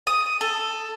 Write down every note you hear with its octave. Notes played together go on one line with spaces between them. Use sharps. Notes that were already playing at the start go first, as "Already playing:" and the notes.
D#6
A4